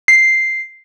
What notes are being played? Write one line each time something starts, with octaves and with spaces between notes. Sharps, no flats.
C7